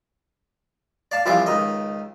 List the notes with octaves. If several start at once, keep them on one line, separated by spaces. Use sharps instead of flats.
D5 F5 A5
C2 E3 F3 D5 F5 D6
C#2 D#3 D#5